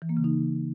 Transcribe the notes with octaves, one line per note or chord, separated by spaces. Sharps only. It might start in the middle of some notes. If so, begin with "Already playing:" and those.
E3
A#3
C#3
D#4